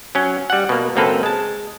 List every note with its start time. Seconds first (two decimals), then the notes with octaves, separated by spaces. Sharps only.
0.15 F#3 C#4
0.50 G3 F#5
0.69 B2 A#3
0.96 C#2 F#2 A#3 C4 A4 B4
1.23 G#3 A5